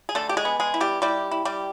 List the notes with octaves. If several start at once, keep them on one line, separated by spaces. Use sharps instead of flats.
G#4
D3 A3 A4
G4
G#3 G#4
B3
G#3 G#4
E4
G3 G4
G3 E4 G4
E4
G3 G4